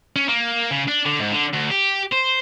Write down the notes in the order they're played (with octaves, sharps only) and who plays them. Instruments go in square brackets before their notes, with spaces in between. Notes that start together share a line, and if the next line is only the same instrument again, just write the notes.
[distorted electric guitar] C#4
A#3
C#3
D4
D3
G#2
D3
D2
G4
C5